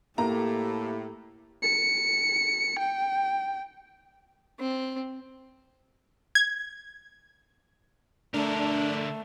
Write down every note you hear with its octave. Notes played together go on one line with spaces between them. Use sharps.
A2 A#3 G4 A#5
C#7
G5
C4
G#6
D3 A3 D4 A#4